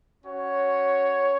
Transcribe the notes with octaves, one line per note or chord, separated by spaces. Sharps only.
C#4 F#4 C#5